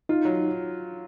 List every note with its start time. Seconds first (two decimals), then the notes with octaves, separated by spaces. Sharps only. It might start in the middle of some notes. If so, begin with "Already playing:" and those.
0.09 D#4 F4
0.25 F#3